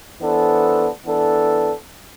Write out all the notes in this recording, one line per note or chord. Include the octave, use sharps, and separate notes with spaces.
E3 B3 D4 A4 C5
E3 B3 D4 A4